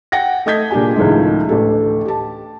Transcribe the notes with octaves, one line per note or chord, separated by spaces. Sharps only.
F#5 G5 A#6
A3 D#5 D#6 G6 G#6 B6
A#2 D4 G4 G#4 G#5
C#2 A2 D#3 F3 G#3
A1 D2 A4
G4 A5